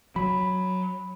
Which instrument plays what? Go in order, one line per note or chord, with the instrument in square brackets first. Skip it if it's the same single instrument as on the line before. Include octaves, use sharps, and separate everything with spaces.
[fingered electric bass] F#3 [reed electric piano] B5